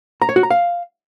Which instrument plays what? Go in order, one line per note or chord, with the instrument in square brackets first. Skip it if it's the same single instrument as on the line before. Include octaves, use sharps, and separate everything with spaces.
[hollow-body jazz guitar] A#5
C#5
F#4
A#5
F5